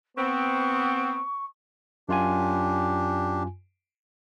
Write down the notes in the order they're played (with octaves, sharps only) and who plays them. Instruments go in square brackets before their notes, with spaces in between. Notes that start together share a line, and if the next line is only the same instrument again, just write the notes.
[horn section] B3 C4 [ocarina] C#6
[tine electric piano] F#2 F4 G#5 [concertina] D4 G4